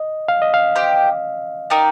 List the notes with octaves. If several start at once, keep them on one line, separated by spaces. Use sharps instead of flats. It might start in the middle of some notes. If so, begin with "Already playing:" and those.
Already playing: D#5
F5
D#5
F5
G4 C5 G5
D#4 G4 A#4 D5